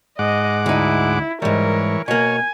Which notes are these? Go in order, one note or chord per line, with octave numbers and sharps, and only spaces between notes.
G#2 D#5 F#5 D6
D2 D#4 E4
G#2 E3 G3 A#4 C#5
B2 A#3 C#5 G#5